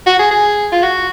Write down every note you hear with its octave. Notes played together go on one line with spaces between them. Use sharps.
F#4
G#4
G#4
F4
F#4